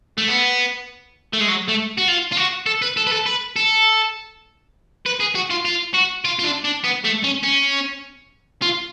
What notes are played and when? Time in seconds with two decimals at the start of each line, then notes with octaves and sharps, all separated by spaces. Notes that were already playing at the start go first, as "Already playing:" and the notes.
0.18 A3
0.28 B3
1.33 A3
1.40 G#3
1.48 F#3
1.68 A3
1.98 F#4
2.08 F4
2.32 F4
2.37 F#4
2.66 A4
2.82 B4
2.97 A4
3.07 B4
3.12 A4
3.26 B4
3.56 A4
5.06 B4
5.20 G#4
5.35 F#4
5.50 F4
5.65 F4
5.94 F#4
6.25 F4
6.39 F4
6.44 D4
6.64 D4
6.84 B3
7.04 A3
7.24 C#4
7.43 C#4
8.62 F4